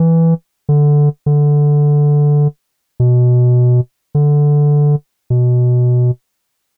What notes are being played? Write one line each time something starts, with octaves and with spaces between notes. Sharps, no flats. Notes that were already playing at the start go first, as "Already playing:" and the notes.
Already playing: E3
D3
D3
B2
D3
B2